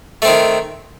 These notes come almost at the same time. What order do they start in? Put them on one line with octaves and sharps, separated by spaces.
A3 C4 D#3